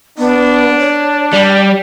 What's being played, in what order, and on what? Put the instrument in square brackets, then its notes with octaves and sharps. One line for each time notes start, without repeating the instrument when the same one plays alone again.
[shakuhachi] B3 [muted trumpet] D4
[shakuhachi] C#5
[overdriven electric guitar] G3 [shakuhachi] D5